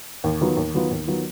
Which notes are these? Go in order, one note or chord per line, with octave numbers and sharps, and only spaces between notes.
D#2
D#3 F#3 B3 F4
D#2
D#3 F#3 B3 F4
D#2
D#3 F#3 B3 F4